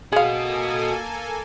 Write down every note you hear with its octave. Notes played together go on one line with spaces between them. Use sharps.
A#3 F#4 G#4 A4 D#5 F5 G#5